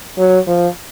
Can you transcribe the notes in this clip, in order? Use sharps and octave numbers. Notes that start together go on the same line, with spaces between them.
F#3
F3